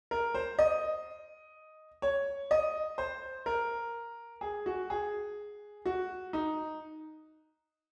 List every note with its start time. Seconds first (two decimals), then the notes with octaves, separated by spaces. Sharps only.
0.11 A#4
0.34 C5
0.59 D#5
2.02 C#5
2.51 D#5
2.98 C5
3.46 A#4
4.41 G#4
4.66 F#4
4.90 G#4
5.85 F#4
6.33 D#4